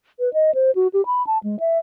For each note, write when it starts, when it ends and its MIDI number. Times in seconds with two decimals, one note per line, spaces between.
0.19 0.32 71
0.33 0.54 75
0.54 0.71 72
0.75 0.88 66
0.93 1.05 67
1.06 1.25 83
1.27 1.38 81
1.43 1.59 56
1.60 1.78 76